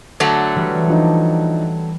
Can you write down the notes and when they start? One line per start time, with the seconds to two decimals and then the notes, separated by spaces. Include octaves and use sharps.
0.20 D3 F#3 A3
0.55 E3 G3
0.88 F3 D4 D#4